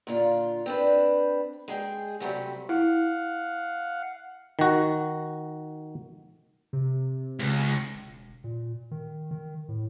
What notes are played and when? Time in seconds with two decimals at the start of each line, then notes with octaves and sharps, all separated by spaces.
0.07 A#2 D3 F4
0.66 C4 D4 B4
1.68 G#3 G#4 G5
2.20 C3 F#3 G3 A3 C4
2.69 E4 F5 F#5
4.59 D#3 F#4
6.73 C3
7.40 C#2
7.95 E1
8.44 A#2
8.91 D#3
9.31 D#3
9.69 A2